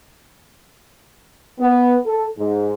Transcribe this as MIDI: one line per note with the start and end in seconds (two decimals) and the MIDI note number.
1.60 1.96 59
2.06 2.25 69
2.38 2.73 44